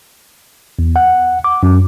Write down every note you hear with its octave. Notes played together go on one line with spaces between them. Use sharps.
E2
F#5
D6
F#2